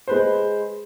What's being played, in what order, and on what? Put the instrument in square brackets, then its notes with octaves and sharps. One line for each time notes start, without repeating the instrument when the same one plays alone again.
[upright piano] G#3 B4 C5